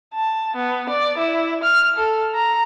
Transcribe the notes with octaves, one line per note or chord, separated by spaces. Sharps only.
A5
B3
D5
E4
F6
A4
A#5